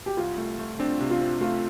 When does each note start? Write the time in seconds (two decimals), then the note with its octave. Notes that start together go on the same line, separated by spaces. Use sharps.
0.06 G4
0.17 C2 F4
0.38 A3
0.59 A3
0.79 C4 D4
1.01 C3
1.10 F4
1.21 C4
1.41 A3 F4